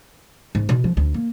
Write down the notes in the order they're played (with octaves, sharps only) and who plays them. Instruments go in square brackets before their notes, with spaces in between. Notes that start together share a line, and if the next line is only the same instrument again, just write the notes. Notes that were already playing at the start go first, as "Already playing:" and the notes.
[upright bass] G#2
B2
F3
D2
A#3